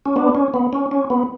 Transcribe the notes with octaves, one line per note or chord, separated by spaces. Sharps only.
C#4
B3 D4
C#4
B3
C#4
C#4
B3